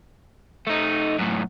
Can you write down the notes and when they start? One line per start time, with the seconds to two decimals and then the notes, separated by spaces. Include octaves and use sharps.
0.67 A3 D#4
1.18 F#2 A2